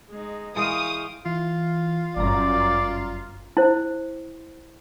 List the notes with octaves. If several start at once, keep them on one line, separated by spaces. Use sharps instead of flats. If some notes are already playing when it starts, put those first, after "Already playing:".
G#3 D#4
E3 G#3 A#4 F5 G5 C#6 D#6
E3 F4
G1 F#2 D5 A#5
E4 C5